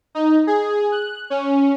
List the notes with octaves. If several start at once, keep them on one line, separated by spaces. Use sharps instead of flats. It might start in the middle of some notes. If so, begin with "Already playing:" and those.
D#4
G#4
F#6
C#4